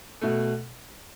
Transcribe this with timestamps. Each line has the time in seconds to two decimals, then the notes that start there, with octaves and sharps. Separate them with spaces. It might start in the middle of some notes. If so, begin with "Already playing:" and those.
0.21 B2 A3